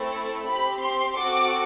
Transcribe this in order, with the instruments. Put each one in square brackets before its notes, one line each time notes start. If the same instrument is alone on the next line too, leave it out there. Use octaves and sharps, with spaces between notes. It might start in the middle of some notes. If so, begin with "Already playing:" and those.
Already playing: [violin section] A3 C4 E4 A4
C4 G4 B5
C6
C4 F#4 A4 D6